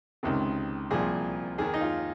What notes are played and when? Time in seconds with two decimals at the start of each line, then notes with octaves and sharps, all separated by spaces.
0.23 C#2 C3 D#3
0.91 C2 A#2 F3 G#4
1.58 D#2 D#3 G#4
1.74 D#4
1.81 F4